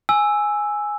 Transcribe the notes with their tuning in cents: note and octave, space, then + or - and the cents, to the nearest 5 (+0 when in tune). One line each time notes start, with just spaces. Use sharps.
G#5 +0 E6 +0